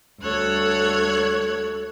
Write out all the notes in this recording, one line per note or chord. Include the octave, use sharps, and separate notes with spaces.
D2 G3 A4 C#5 F#6 G#6